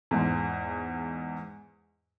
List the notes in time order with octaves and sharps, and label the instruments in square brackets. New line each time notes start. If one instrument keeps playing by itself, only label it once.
[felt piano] E2 G#2